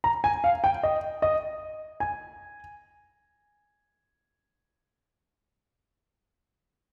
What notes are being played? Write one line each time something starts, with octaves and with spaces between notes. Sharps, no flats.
A#5
G#5
F5
G5
D#5
D#5
G#5